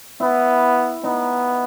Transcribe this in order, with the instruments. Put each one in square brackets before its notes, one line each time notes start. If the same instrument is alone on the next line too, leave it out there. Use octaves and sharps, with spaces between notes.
[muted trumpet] B3 [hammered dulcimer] E4
[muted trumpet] B3 [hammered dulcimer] D#4